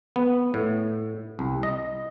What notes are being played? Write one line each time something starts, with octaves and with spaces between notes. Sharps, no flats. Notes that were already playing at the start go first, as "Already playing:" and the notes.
B3
A2
C2
D#5